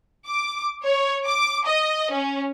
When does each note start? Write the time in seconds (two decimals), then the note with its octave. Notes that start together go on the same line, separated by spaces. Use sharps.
0.27 D6
0.84 C#5
1.26 D6
1.66 D#5
2.12 C#4